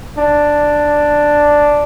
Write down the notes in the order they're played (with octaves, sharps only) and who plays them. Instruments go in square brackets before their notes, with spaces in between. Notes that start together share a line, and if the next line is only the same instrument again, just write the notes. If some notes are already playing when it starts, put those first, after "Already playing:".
[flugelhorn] D4